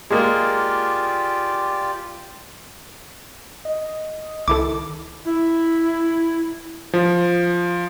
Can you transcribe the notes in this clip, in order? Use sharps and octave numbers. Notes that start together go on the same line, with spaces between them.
G#3 A#3 F4 G4 D5
D#5
C#2 D#3 E4 A4 D6
E4
F3